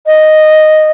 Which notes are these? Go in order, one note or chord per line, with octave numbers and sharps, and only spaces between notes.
D#5